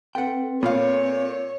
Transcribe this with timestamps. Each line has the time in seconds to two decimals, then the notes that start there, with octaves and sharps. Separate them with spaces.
0.15 C4 A4 B4 F#5 G5
0.63 A#2 B3 F4 C#5 F5